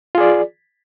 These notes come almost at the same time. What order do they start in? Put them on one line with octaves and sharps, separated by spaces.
F4 G#4 D5